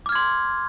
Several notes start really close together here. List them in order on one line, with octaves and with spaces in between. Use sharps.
D6 F6 G#6 C6